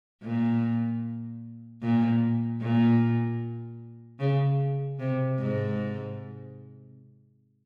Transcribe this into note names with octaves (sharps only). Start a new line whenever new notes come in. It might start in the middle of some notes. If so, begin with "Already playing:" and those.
A#2
A#2
A#2
C#3
C3
G#2